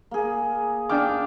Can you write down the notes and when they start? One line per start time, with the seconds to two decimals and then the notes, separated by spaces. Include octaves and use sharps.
0.11 A#3 G#4
0.89 D4 F5 G5 D6